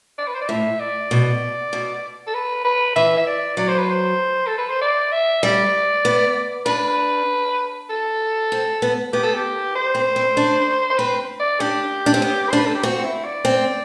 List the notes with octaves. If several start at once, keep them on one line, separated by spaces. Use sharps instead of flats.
D5
B4
C5
D5
A2 E5
D5
B2
B2
A4
B4
B4
E3 E5
E5
D5
F#3 D5
C5
B4
C5
A4
B4
C5
D5
E5
G3 D5
B3
D4 B4
A4
C4
B3
B3 G4
A4
G4
C5
C4
C4
D4
C5
C4 B4
D5
D4 G4
D4
C4
B3
D4 C5
B4
A4
G4
C4 F#4
F#4
E4
D5
C4